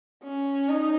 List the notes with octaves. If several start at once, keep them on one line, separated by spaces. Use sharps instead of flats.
C#4
D#4